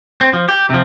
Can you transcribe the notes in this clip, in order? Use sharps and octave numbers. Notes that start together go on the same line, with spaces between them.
C4
F3
G4
C3 F3